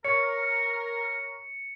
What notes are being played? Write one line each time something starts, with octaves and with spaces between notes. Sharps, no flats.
A#4 C#5 C#7